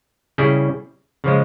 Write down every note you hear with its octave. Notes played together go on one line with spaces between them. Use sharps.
C#3 G3 C#4 E4 G#4
C#3 F3 G#3